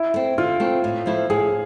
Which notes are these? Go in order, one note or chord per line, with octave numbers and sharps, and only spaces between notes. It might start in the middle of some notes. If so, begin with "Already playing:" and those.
Already playing: E4
A3 C4
D3 F4
A3 C4
A2
F3 A3 E4
A2 G#4